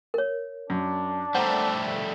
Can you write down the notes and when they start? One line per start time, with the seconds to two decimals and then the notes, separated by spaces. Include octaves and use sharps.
0.14 A#4 C#5
0.70 F#2 D4
1.35 G3 A3 C5 F#5 A#5